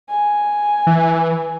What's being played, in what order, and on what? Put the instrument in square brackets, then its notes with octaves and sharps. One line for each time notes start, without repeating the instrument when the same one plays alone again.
[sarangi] G#5
[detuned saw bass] E3